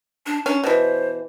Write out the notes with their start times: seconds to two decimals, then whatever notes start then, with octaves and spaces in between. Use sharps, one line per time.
0.26 D4
0.46 C#4 D4
0.63 B2 E3 C5